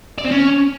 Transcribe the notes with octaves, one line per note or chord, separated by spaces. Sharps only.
D5
C4
C#4